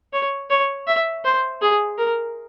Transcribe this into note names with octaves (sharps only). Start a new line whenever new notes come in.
C#5
C#5
E5
C5
G#4
A#4